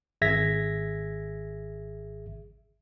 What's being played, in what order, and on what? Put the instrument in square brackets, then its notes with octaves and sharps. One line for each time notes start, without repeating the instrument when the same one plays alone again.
[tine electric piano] G#1 G#4 E5 G#6 A#6 B6